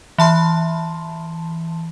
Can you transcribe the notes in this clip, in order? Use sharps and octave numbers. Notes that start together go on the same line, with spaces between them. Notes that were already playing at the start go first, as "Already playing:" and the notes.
E3 A5 C6